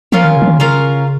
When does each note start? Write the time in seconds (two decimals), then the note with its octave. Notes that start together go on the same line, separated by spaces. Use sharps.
0.12 F3 C#4 F4 A#4 F5
0.24 D#3
0.37 C#3
0.42 F3
0.48 D#3
0.59 C#3 C#4 F4 A#4 F5